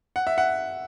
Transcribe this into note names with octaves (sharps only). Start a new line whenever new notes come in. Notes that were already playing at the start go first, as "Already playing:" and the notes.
F#5
E5
F#5